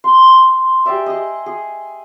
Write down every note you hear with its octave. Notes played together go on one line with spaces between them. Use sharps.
C6
G4 G#4 D5 E5
G#4 D#5
G#4